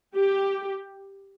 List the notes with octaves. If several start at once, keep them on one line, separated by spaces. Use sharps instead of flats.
G4